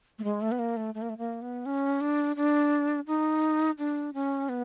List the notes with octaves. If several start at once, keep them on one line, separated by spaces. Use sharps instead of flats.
A3
G#3
A3
B3
A#3
A3
A3
A#3
A3
A#3
B3
C#4
D4
D4
D#4
D4
C#4
B3